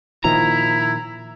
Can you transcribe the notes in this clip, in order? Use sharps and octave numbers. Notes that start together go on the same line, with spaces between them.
A#2 D#3 F3 E4 A#5